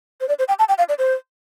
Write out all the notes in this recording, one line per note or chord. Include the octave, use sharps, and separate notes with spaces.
C5
D5
C5
G5
A5
G5
F5
D5
C5